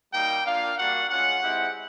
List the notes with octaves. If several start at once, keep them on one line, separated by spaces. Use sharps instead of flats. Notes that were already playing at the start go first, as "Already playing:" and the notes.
G3 A#3 D#4 F#4 G5
A#3 D4 F4 F5
G3 A#3 D4 F#4 F#5
G#3 C#4 F4 F#5
G#3 C4 E4 G4